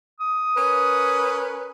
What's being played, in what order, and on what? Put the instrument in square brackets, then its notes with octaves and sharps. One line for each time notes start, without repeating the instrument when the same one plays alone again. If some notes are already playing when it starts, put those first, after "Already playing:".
[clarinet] D#6
[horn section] C#4 A#4 B4